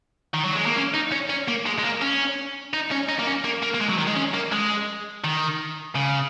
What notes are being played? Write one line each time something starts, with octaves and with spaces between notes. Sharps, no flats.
D#3
F#3
G#3
A#3
C#4
D#4
C#4
C#4
A#3
G#3
G#3
A#3
C#4
D#4
C#4
D#4
A#3
C#4
A#3
A#3
A#3
G#3
F#3
D#3
G#3
C#4
A#3
G#3
D#3
C#3